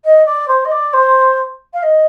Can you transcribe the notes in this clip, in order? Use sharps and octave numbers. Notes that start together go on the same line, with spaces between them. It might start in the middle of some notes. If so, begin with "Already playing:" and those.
D#5
D5
C5
D#5
D5
C5
F5
D#5